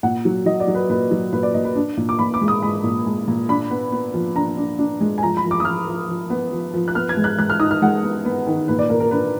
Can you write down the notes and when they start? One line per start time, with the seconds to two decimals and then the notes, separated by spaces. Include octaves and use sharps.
0.03 A#2 F#5
0.25 F#3
0.46 F#3 D#5
0.60 D5
0.67 F#3
0.75 B4
0.90 A#2 B4
1.11 F#3
1.33 A#2 B4
1.43 D5
1.54 A#2 D#5
1.65 B4
1.75 D4
1.97 A#2
2.09 D6
2.19 A#2 B5
2.34 D6
2.41 G#3
2.48 D#6
2.62 G#3 B5
2.84 A#2
3.06 G#3
3.28 A#2
3.49 D4 B5
3.70 B3
3.92 B3
4.14 F3
4.36 D4 A#5
4.57 D4
4.79 D4
5.00 G#3
5.18 G#5
5.22 F3 A#5
5.37 B5
5.44 F3
5.51 D6
5.60 D#6
5.65 F3 F6
5.87 F3
6.09 F3
6.30 B3
6.52 F3
6.74 F3
6.88 F#6
6.95 B3 F6
7.09 G#6
7.17 G#3
7.24 F#6
7.39 G#3 F#6
7.50 F6
7.60 D#4 D#6
7.71 F6
7.82 G#3 F#5
8.03 B3
8.25 B3
8.47 D#3
8.68 A#2 B4
8.79 D5
8.90 A#2 A#4
9.00 A#4
9.11 D4 B4